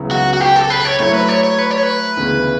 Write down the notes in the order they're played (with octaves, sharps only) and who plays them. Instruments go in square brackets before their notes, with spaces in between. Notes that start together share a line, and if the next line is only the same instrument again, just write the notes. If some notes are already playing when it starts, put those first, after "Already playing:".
Already playing: [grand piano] C#2 C#3 F#3 B3 E4
[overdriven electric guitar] F#4
F#4
G4
A4
B4
C#5
[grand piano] F#3 A3 E4 A4 [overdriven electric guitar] C#5
[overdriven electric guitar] B4
C#5
C#5
B4
C#5
B4
[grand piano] D2 C#3 E3 B3